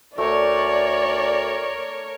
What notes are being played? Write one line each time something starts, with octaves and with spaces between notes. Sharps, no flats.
D2 A3 A#4 C#5 D5